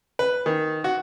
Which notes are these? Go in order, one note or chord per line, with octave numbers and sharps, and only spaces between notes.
B4
D#3
F#4